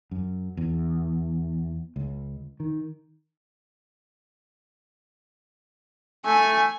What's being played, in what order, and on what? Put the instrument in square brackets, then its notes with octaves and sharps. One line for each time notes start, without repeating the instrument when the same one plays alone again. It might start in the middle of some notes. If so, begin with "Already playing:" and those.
[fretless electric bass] F#2
E2
C#2
D#3
[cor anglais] A3 [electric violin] G#5